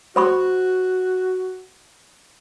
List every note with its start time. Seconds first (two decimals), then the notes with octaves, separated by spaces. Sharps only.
0.16 F#4 C5 B5 C#6